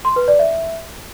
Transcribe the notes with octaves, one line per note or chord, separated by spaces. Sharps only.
C6
B4
D5
E5